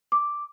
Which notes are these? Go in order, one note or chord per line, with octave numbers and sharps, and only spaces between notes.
D6